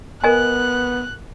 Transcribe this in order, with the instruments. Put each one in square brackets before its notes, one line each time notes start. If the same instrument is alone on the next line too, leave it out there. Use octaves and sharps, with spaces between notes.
[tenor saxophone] B3 [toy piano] A#4 D#5 G#5 [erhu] F#6